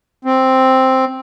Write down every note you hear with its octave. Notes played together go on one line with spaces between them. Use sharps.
C4